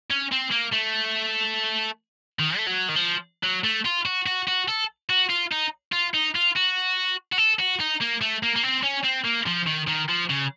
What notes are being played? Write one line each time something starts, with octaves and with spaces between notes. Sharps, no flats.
C#4
C4
A#3
A3
D#3
A3
F#3
D#3
F3
F#3
A3
F4
F#4
F#4
F#4
A4
F#4
F4
D#4
F4
D#4
F4
F#4
F#4
A4
F#4
D#4
A#3
A3
A#3
A#3
C4
C#4
C4
A#3
F3
D#3
D#3
F3
C#3